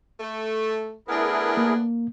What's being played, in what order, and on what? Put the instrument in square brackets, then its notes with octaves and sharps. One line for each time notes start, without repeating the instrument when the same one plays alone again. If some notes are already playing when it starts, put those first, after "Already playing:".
[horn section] A3
[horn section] A3 B3 D4 [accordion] E4 G#4 A#4
[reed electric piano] A#3